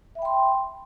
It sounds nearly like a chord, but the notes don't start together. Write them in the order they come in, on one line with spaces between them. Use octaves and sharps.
E5 B5 G5 C6